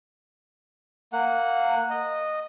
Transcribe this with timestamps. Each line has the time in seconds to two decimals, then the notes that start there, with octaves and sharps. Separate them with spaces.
1.13 A#3 F#5
1.90 D#5